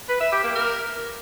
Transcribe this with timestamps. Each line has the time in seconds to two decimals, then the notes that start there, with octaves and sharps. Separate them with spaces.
0.09 B4
0.21 E5
0.32 G4
0.44 A#3
0.55 A#4